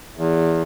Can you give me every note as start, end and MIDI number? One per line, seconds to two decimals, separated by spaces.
0.17 0.63 40